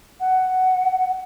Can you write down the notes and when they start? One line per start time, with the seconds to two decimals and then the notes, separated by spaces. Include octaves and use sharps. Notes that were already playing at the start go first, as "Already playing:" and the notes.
0.20 F#5